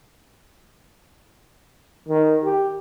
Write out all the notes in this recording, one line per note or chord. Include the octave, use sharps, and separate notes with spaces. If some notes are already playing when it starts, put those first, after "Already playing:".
D#3
G4